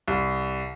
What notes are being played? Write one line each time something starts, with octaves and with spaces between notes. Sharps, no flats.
C2